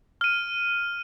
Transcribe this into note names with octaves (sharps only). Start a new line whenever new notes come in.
F6 D#7